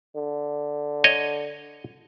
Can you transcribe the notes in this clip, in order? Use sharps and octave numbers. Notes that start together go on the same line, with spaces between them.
D3
C#5 D#5